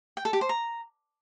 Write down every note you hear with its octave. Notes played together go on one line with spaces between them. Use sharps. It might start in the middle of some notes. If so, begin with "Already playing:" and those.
G5
A4
G4
C5
A#5